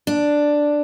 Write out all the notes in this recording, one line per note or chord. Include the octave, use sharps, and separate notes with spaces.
D4